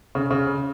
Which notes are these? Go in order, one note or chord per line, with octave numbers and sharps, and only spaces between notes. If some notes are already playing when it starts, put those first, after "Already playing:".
C#3
C#3